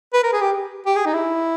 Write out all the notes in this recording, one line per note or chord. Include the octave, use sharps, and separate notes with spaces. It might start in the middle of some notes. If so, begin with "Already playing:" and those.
B4
A#4
G#4
G4
G4
G#4
D#4
E4